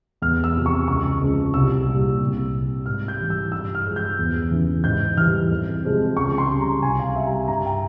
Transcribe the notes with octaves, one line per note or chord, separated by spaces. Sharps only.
E2 F6
E6
C3 F3
C#6
C#2 C#6
C#3 F3 G#3
C2 E6
A#2 G3
C2
C3 G3
G#2 F6
G6
E3 G3
E6
G2 E6
F6
F3 G#3
G6
E2
C#3 E3
G#2 G6
E3 G3 F6
F2
C3 F3 G#3
C#2 C#6
C6
C#3 G3
A#5
C2 G#5
F5
C3 G3 E5
A#5
G#5
G2 A#5
G5